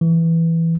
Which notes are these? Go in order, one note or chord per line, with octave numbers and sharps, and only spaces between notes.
E3